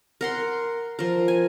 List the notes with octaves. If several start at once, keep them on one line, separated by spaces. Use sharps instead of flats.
A#4 F#5 C6
F3 A#4
G#5